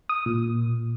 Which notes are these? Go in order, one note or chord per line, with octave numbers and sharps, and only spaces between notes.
D#6
A#2